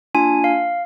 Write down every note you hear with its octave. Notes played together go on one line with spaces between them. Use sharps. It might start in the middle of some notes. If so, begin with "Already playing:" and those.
A#3 D4 F4 G#5
F5